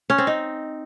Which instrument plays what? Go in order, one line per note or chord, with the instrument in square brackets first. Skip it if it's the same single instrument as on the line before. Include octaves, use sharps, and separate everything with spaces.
[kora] C#4
C4
D#4